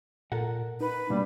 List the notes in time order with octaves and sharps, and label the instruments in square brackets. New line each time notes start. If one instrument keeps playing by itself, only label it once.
[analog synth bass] A#2 [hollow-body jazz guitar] A4 A#4 F#5
[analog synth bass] D#4 [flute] B4
[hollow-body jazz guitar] B2 D4 [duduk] G3 [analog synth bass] A#3